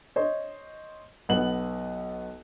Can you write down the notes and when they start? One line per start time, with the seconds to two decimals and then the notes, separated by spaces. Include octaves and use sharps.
0.16 C5 C#5 D#5
1.29 B1 B3 F#7